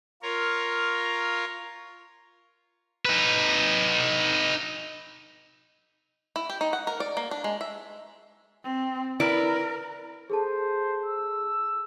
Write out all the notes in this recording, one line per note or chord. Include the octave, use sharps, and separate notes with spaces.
F4 A#4 C#5
D#4 B4
E4
G4
D#4
F#5
A#4
D5
A#3
D4
G#3
E5
C4
E4 A#4 B4 D5
G#4 A4 C5 A5
E6